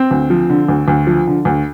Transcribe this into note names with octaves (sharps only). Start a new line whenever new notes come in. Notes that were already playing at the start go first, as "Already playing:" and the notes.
Already playing: C4
D2
F3
D3
D2
D2
F3
D3
D2